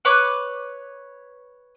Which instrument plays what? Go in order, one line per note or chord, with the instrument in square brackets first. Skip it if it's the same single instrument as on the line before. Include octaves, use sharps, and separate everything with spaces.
[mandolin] B4 C#5 D6